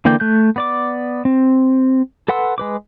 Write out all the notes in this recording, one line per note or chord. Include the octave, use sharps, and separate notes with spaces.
D3 E3 A#3 D5 G5
A3 F#6 G6
B3 D5 D6
C4
A4 B4 F#5 C6 E6
G#3 B4 D6